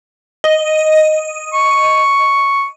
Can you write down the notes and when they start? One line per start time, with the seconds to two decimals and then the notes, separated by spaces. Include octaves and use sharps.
0.44 D#5
1.54 C#6